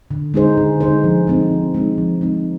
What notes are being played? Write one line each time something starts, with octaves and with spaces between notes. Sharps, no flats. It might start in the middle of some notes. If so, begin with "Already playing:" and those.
D3
G#3 D#4 G#4 C5
D3
G#3 D#4 G#4 C5
F3
G#3 C4 D#4
F3
G#3 C4 D#4
F3
G#3 C4 D#4